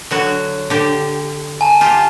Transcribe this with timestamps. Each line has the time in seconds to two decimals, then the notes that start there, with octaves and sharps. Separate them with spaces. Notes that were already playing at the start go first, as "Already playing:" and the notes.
0.11 D3 F#3 F#4
0.70 D3 G4
1.61 G#5 A5
1.81 F4 G4